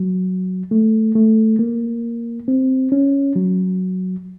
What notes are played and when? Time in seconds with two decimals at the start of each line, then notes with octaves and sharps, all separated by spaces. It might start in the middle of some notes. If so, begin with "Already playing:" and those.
Already playing: F#3
0.71 A3
1.15 A3
1.59 A#3
2.48 C4
2.92 C#4
3.36 F#3